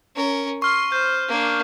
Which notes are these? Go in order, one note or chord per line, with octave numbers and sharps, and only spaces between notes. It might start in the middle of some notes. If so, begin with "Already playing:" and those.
C#4 A#4
C6 C#6 F6
C5 G6
A#3 D4